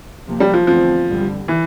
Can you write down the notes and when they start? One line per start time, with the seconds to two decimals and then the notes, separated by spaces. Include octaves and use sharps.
0.27 C3 F3 A#3
0.40 G3
0.54 F3
0.67 E2 D3 F3 A3 C4
1.08 G2 D3 G3
1.48 E3